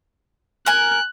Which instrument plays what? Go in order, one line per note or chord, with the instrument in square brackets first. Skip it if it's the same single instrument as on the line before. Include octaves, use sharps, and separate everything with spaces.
[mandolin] A#4 G#5 [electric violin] F#6